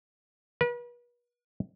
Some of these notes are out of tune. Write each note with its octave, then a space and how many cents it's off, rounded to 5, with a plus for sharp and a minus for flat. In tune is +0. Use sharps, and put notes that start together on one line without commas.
B4 -40